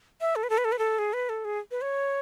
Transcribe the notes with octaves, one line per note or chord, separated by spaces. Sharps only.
E5
A4
B4
A4
B4
A4
B4
A4
G#4
B4
A4
G#4
B4
C#5